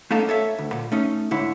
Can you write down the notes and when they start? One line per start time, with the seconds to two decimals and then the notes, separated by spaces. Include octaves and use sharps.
0.11 A3 A#3 C#4 D#4 A4 F5
0.29 A4 C#5 E5
0.58 D2
0.73 A#2
0.92 A3 C#4 D#4
1.31 G#2 D3 E4 C#5